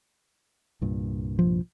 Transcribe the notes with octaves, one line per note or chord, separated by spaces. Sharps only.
C2 G2 A#2
F3